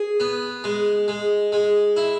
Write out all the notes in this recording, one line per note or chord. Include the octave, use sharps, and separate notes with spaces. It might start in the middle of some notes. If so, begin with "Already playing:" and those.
Already playing: G#4
B3
G#3
G#3
G#3
E4